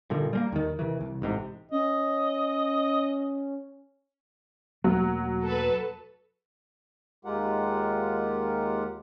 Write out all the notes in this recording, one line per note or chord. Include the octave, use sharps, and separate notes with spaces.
G2 A#2 D3 D#3
G3 G#3 A#3
D#2 D#3
C3 D#3 E3
C2
A1 G#2 C3
C#4 D#5
E1 F#3 A3 A#3
A4 B4
D#2 G#3 F4 G4 A#4 F#5